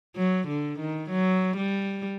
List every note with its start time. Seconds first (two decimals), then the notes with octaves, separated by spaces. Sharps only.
0.16 F#3
0.48 D3
0.79 D#3
1.10 F#3
1.57 G3